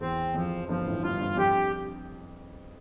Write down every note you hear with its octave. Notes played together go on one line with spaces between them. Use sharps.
E2 C4
F2 F3
G1 G2 F3
A1 A2
G1 G2 F4
G1 G2
F2 G4